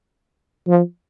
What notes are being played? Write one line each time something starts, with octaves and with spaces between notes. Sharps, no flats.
F3